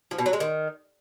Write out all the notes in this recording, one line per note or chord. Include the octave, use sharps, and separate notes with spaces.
F3
B2
F#3
G#3
D#3